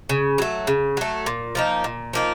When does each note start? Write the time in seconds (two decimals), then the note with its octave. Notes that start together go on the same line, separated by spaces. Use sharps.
0.09 C#3
0.38 F#3 A3
0.67 C#3
0.97 F#3 A3
1.26 A#2
1.55 F3 A#3 D#4
1.84 A#2
2.13 F3 A#3 D#4